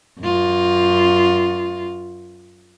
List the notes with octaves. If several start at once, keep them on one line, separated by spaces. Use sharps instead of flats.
F#2 F4